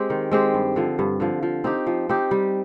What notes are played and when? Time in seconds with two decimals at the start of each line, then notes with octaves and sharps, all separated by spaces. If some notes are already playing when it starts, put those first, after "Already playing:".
Already playing: G#3 C4 G4
0.10 D#3
0.31 G#3 C4 G4
0.54 G2
0.76 D3 F3
0.99 G2
1.20 D3 F3
1.43 F3
1.64 C4 D#4 G4
1.87 F3
2.09 C4 D#4 G4
2.31 G3